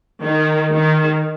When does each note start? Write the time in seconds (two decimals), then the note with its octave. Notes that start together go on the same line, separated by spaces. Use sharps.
0.23 D#3
0.73 D#3